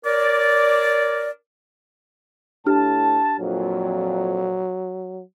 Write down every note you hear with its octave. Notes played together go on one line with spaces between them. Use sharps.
A#4 C#5 D5
A2 D4 G4 A5 F6
F2 A#2 F#3